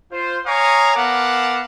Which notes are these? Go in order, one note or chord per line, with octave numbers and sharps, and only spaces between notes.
F4 C5
C#5 F5 G#5 A#5 C#6 D#6
B3 A#4 F5 F#5 A5 D6